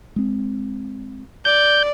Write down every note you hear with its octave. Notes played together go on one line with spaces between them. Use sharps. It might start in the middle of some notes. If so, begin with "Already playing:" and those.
G#3 C4
D5 G6